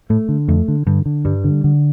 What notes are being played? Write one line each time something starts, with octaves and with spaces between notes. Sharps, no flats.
A2 A3
D3
F2 A3
D3
G2 D3
D3
G2 G3
D3
D3